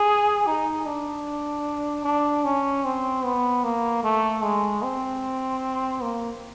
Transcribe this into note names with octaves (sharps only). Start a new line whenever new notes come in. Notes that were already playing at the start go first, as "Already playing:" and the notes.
Already playing: G#4
D#4
D4
D4
C#4
C4
B3
A#3
A3
G#3
C4
A#3